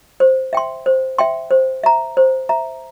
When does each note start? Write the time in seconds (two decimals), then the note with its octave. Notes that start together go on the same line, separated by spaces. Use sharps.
0.20 C5
0.53 E5 G5 C6
0.86 C5
1.18 E5 G5 C6
1.51 C5
1.84 E5 A#5
2.17 C5
2.49 E5 A#5